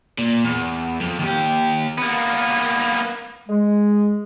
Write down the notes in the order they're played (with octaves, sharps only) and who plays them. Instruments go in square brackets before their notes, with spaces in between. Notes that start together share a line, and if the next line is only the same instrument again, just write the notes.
[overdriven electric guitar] A#2
E2
F2
D#2 G4
[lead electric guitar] A#3 B3
[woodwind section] G#3